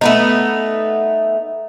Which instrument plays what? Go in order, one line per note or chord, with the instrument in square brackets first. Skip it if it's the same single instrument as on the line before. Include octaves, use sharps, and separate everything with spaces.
[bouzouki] A3 B3 D#4